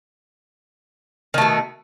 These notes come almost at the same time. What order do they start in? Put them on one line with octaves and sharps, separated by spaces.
D#3 A3 B2